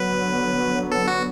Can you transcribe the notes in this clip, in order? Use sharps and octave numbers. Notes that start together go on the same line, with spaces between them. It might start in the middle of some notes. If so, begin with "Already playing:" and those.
Already playing: D3 F#3 B3 B4
A4
F#4